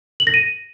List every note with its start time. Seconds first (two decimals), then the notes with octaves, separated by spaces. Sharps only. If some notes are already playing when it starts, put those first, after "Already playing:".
0.20 F#7
0.27 A#6
0.34 D#7